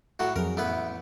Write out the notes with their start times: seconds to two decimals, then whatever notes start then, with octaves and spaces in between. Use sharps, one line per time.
0.19 A2 F#3 F#4
0.36 F2 F#3 G#4 A#4
0.57 A1 B3 B4 E5